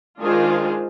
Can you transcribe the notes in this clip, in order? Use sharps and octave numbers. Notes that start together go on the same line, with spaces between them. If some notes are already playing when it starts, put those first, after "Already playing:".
D#3 G#3 D4 F4 G#4 C5